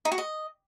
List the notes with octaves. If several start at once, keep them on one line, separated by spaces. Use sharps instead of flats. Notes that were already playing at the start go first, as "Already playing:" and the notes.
D#4
F#4
D#5